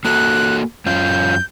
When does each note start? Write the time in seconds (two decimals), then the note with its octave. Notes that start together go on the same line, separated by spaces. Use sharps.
0.05 A#3 F#4 A4 F#6
0.86 F#2 C#4 F4 G6